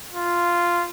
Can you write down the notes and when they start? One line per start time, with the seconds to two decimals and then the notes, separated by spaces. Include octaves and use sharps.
0.14 F4